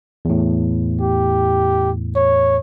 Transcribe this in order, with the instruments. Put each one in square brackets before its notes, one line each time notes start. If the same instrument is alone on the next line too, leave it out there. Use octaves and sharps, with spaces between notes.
[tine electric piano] E2 A2
[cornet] G4
C#5